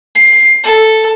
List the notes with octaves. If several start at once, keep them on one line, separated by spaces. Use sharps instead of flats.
C7
A4